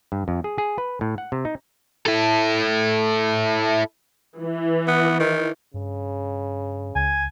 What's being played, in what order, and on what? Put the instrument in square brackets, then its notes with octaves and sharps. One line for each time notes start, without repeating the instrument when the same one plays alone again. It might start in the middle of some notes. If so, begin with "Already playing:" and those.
[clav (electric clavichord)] G2
F2
G#4
G#4
B4
A2
F#5
C3
D#4
[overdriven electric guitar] E4 A4
[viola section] E3
[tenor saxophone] B3
D#3
[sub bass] G2 [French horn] C#3
[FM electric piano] C#2 [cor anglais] G#5